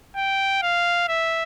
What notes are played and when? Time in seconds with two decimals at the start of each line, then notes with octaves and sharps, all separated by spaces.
0.16 G5
0.63 F5
1.09 E5